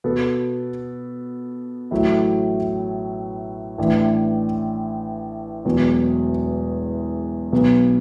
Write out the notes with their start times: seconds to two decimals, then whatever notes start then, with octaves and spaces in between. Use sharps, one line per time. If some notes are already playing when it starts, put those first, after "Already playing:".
0.04 B2 B3 F#4 A4
1.91 A1 A2 F#3 A3 E4
3.78 A1 A2 E3 D4
5.65 E1 E2 B2 F#3
7.53 B1 B2 B3